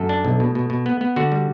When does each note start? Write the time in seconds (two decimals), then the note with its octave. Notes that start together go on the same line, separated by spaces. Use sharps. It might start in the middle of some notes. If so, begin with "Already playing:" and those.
Already playing: F#2 A4
0.09 D4
0.25 B1
0.40 B2
0.55 B2
0.70 B2
0.86 B3
1.01 B3
1.16 D3 F#4
1.32 G3